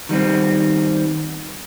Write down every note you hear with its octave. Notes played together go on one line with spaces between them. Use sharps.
D#3 G3 B3 C4